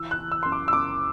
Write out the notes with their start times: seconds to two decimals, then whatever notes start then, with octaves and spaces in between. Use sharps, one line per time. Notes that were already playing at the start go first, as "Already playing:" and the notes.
Already playing: E3 E6
0.11 F#6
0.18 E3
0.32 E6
0.43 F#2 C6
0.52 D6
0.68 E6
0.73 F#2 D6